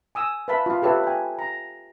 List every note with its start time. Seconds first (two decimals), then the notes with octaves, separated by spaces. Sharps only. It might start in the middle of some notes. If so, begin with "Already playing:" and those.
0.15 G#5 D#6 E6
0.48 B4 E5 F5 A5 B5
0.66 F4 F5
0.82 G4 A4 B4 C#5 E5
1.04 G5 G#5
1.39 A#5